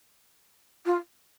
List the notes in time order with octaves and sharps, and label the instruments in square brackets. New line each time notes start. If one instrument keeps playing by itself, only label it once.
[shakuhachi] F4